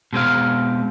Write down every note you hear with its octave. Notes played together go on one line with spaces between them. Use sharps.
B2 G#3 C4 F5